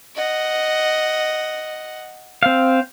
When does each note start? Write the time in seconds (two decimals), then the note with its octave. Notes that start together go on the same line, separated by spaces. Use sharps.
0.16 D#5 F#5
2.43 C4 F5